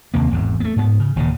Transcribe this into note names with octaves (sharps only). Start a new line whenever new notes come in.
D#2 C3 A#3
G#1 E2 G#2
A3 B3
G#2 B3
C#3
E1 D#2 A#2 C#3